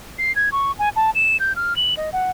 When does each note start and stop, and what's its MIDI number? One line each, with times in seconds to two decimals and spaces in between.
0.18 0.34 96
0.36 0.49 92
0.52 0.72 85
0.79 0.89 80
0.96 1.10 81
1.15 1.37 100
1.40 1.53 91
1.56 1.76 89
1.76 1.94 102
1.97 2.10 75
2.13 2.31 78